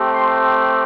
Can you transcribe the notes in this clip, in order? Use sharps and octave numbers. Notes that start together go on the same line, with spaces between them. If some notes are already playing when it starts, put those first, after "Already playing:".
Already playing: A3 C4 G4
C6